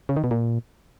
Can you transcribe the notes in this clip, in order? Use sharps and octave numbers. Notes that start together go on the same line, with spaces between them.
C#3
D#3
B2
A#2